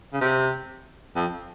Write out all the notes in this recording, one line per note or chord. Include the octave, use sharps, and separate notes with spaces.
C#3
C3
F2